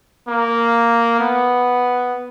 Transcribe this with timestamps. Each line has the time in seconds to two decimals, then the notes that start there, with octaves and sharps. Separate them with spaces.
0.28 A#3
1.20 B3